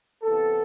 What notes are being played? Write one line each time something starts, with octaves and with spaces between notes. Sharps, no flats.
C3 E3 B3 A4